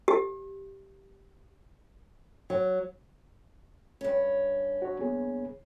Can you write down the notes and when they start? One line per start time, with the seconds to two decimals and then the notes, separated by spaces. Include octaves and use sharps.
0.08 G4
2.50 F#3
4.01 G2 C#4
4.82 F#4 C#5
4.99 A#3 B3 G#4